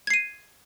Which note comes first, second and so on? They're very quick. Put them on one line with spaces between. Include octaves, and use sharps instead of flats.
G#6 C7 D#7